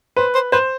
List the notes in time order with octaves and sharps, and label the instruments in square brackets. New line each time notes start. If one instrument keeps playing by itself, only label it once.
[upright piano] B4 [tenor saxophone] C5
[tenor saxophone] C5
[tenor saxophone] B4 [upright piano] C5